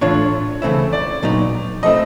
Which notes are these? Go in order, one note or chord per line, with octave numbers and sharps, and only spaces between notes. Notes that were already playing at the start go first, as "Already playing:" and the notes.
A2 E3 A3 D4 F4 C#5
C#3 E3 A3 C4 E4
D5
A#2 F#3 B3 D#4
F3 A3 C4 E4 D#5